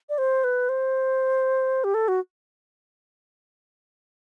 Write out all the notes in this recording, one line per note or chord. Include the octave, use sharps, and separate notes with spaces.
D5
C5
B4
C5
G4
A4
F#4